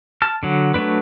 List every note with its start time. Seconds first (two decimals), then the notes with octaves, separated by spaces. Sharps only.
0.22 A5 F6
0.43 D3 F#3
0.74 F#3 A3 D4 B4